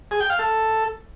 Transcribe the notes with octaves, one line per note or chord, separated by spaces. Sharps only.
G#4
G5
F5
A4